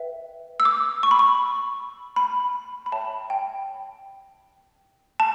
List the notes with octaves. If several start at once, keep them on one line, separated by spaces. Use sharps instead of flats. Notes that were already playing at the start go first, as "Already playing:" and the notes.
Already playing: B4 E5 G5
E6
D6
C#6
B5
C#6
B5
B5
C#5 E5 G5 A5
G5
A5